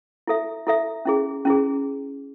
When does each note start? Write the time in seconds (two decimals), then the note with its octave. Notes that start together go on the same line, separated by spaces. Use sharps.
0.27 E4 A4 E5
0.67 E4 A4 E5
1.05 C#4 E4 G#4
1.45 C#4 E4 G#4